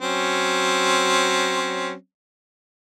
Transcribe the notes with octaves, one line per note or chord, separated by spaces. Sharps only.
F#3 C4 C#4